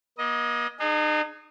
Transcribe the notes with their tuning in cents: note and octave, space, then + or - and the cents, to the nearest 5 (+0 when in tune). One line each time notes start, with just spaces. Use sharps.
A#3 +45 D#5 +10
D#4 -40 G#4 +0